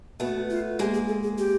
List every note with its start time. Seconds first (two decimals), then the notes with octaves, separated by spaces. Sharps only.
0.20 A3 B3 F#4
0.50 F4
0.79 G#3 A#3 G4
0.94 G#4
1.08 A4
1.23 G#4
1.38 G4